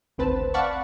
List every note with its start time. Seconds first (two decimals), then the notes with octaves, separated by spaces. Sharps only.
0.18 G#1 D2 C4 B4 A5
0.54 D5 F5 F#5 A5 B5 C#6